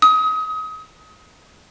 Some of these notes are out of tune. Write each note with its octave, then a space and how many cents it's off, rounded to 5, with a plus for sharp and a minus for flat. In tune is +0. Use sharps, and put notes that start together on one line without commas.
D#6 +30